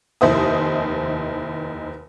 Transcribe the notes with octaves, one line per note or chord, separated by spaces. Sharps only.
F1 D#2 E4 C5 E5 D#6